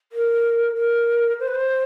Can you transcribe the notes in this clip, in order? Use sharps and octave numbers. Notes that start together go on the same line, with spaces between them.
A#4
A#4
C5
B4
C5